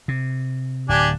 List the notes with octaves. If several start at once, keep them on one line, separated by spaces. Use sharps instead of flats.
C3
D1 D4 G4 G#5